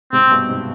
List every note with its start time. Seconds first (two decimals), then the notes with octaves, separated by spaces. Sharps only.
0.13 G#2 C3 C4
0.31 G2 B2
0.49 G#2 C3